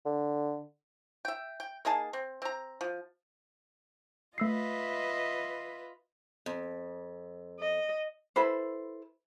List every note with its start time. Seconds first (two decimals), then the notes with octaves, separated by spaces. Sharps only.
0.06 D3
1.25 E5 G5
1.60 G5
1.85 A#3 D#4 G#4 A5
2.13 C4
2.42 C4 A#5
2.81 F3
4.38 A3 F4 B4 D#5 E5 E6 C7
6.46 F2
7.59 D#5
8.36 E4 A4 B4 C5